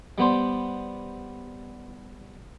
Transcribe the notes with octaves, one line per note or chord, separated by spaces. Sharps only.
G3 B3 C5